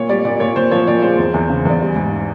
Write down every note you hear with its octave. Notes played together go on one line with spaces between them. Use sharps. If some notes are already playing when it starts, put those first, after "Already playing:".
Already playing: A#2 C#5
G3 D5
A#2 D5
A#2 C#5
A#2 C5
F3 C#5
A#2 D5
G#3 C5
E2
E2
C#3
E2 D5
G3
G#2